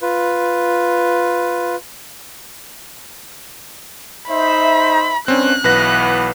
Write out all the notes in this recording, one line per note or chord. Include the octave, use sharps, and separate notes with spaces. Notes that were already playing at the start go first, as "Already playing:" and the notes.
F4 B4
D#4 C5 E5 B5
G2 C4 C#4 F#6
B1 E3 B3 B4 A#6